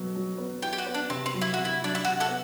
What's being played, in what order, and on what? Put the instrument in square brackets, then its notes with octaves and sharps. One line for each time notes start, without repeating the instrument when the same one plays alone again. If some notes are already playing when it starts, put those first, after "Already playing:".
Already playing: [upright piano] B2 F#3 B3
F#3
B3
[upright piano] E4 [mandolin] G4
[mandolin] G4
F#4
[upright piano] B3
[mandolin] D4
[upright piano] C3 [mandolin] C4
[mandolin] C4
[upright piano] F#3
[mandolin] E4
[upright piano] C3 [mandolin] F#4
[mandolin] E4
[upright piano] F#3 [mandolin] D4
[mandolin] E4
[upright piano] C3 [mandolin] F#4
[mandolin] F#4 A4
[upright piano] B3